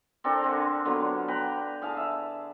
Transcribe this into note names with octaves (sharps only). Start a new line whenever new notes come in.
C4 D4 A4 A#4
D3 G#5
D3 F#3 B3 F4
B4 G5 A#5
G#4 F5 A5
E5